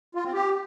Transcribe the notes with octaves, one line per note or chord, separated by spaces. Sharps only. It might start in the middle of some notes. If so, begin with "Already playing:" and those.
F4
C4
G4